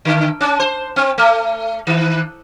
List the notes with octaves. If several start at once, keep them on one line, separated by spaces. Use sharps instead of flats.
D3
C#4
C5
C4
A3
D#3